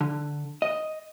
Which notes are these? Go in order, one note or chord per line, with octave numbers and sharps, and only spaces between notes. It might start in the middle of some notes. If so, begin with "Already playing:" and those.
D3
D#5